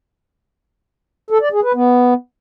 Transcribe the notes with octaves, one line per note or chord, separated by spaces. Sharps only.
A4
D5
G#4
B4
B3